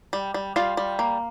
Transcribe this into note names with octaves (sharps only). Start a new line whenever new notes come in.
G3
G3
G3 F4 F5
G3
A#3